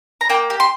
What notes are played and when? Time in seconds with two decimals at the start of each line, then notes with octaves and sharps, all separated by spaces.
0.21 A#5
0.30 A#3 G5
0.50 G4
0.60 C6